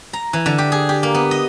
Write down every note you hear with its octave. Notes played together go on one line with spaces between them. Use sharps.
A#5
E3
D3
G4
G#4
G4
A#3
B3
D#5